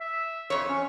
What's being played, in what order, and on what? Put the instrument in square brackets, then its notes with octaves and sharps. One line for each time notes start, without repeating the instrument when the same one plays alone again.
[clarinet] E5
[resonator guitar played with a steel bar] F2 C#5
[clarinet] C#4